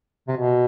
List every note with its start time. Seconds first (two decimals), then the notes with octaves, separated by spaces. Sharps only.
0.28 C3
0.37 B2